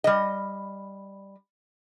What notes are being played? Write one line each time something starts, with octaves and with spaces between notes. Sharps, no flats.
G3 D#5